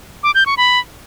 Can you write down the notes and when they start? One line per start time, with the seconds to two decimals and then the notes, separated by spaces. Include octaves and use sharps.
0.23 D6
0.35 G6
0.46 C#6
0.57 B5